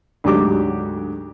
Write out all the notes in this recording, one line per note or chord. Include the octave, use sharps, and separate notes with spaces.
D2 G#2 F#3 G4 D6